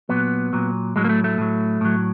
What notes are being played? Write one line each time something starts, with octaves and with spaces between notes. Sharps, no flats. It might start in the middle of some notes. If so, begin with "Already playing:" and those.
A#2 F#3 B3
A#2 F#3
A2 F#3 G#3
A#3
A3
A3
A2 F#3
A2 F#3